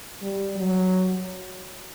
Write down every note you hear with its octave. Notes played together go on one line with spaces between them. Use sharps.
G3
F#3